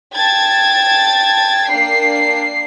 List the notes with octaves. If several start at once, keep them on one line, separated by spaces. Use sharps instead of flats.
G5 A5 G#6 A6
A#3 D4 C7